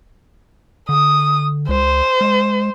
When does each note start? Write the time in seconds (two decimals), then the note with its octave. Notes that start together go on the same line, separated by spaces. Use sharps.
0.89 D3 D#6
1.69 C#2 C5
2.21 G#3